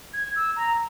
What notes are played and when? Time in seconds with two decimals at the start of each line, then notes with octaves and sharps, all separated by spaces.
0.13 G#6
0.36 E6
0.56 A#5